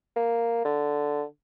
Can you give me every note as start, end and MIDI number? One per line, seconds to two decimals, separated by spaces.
0.16 0.62 58
0.65 1.24 50